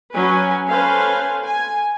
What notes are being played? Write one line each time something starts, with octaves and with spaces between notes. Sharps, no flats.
F#3 C#4 B4 G#5
C#4 A4 B4 C5 F5 G#5
G#5